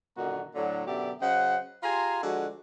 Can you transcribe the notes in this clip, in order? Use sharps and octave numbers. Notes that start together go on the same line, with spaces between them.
F#2 A#2 D3 D#3 F#4 A#5
A2 D3 F#3
F#2 B2 D3 G4 D5 E5
C#3 F#3 C5 D#5 F#5
F4 G4 G#4 G#5 A#5 C6
D3 F3 G#3 F#4